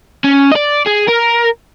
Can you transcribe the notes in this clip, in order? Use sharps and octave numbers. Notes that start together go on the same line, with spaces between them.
C#4
D5 D#5
G#4
A#4